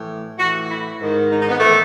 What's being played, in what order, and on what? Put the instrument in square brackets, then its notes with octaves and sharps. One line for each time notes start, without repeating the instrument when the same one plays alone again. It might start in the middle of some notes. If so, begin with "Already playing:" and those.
Already playing: [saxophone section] A2 E3
A2 E3 F#4
E4
G#2 D#3
D#4
D#4
B3
A2 E3 A3